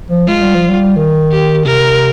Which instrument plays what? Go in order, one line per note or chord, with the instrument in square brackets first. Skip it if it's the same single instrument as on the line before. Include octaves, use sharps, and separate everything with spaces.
[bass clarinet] F3
[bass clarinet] G#3 [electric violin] F4
[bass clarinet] G3
F3
G3
D#3
[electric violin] G4
[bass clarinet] C3 [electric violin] A#4